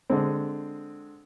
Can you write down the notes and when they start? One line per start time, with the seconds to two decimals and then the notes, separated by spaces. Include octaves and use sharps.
0.10 D3 G#3 C4